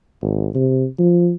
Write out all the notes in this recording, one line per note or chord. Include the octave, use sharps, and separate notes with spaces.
G#1
C3
F3